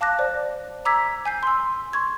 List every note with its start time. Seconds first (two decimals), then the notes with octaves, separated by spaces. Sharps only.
0.01 F5 A5 D6 F#6 A#6
0.19 C5 D5
0.85 A#5 D6 E6 G#6 B6
1.25 G#5 G6 C7
1.43 C6 E6
1.93 C6 C#6 G#6